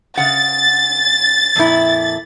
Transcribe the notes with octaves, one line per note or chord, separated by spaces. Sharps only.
C#3 F#5 A6
F2 A#2 E4